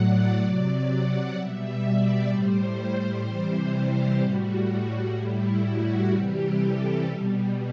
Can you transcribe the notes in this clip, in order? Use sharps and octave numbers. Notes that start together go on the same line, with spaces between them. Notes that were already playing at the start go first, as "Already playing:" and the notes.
Already playing: A2 F#3 D5 F#5
C3 F#3 D5
F#5
B2 G3 E5
D5
A2 G3 C5
C3 E3 G3
G4
A2 G3 F#4
F#4
A2 G3 E4
F#4
C3 E3 G3 G4
A4
B2 G3